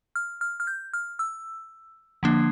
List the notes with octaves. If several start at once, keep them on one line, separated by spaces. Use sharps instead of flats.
F6
F6
F6
G6
F6
E6
D3 F3 A#3 D4